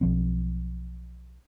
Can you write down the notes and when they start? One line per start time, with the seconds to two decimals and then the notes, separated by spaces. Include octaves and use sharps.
0.01 B1 F3 C4